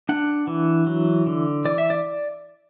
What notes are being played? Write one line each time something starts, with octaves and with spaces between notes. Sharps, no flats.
D4 F#5
E3
F#3
D3
E3 D5
E5
D5